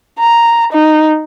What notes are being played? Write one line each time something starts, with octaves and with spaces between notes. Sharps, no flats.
A#5
D#4